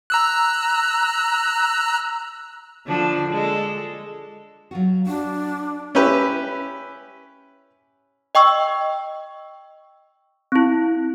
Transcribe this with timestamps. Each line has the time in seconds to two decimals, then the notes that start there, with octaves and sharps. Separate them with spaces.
0.10 A#5 E6 F#6
2.87 D3 F3 D4
3.32 G#3 A4
4.71 F#3 F4 F#4
5.07 D4 F#4
5.95 C#4 E4 G4 B4
8.35 D#5 G5 C#6 E6
10.52 C4 E4